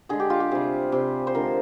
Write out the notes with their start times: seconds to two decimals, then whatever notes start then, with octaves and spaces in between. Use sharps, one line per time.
0.09 D3 G#3 G#4
0.20 G4
0.30 F4
0.40 G4
0.51 C3 G3 G#4
0.92 C3 G3
1.27 C5
1.35 D3 F3 G#3 A#4